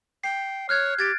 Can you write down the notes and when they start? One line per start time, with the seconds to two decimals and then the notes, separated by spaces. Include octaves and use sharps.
0.24 G5 C7
0.69 C#5 F6 F#6 G#6
0.99 G4 G#6 A6 D7